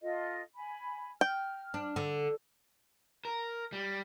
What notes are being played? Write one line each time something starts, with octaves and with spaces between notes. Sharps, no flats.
F4 A4 D#5
G#5 B5
G5 F6
D4
D3
A#4
G3